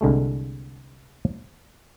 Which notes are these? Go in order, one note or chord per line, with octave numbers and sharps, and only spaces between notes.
C2 D3 G#3 A3